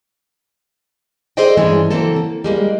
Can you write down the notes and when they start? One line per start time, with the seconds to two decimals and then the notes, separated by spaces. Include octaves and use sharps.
1.37 G#4 A4 C5 D5 D#5 G5
1.57 G2 E3 G#3 A3 C#4 D4
1.91 C#3 E3 F#3 A#3 C4 A4
2.16 A#3
2.44 G3 G#3 A#3